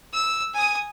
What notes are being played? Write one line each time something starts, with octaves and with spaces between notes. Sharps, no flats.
E6
G#5 D#6